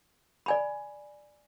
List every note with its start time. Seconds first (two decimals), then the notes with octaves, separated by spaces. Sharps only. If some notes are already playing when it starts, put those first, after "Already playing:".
0.46 D5 G#5 B5